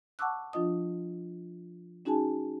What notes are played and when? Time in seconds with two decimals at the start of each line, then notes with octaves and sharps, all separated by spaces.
0.19 F#5 A5 C#6 D6 E6 F#6
0.53 F3 D4 F4 D#5 D#6
2.05 C#4 D#4 F#4 G#4 G#5 A5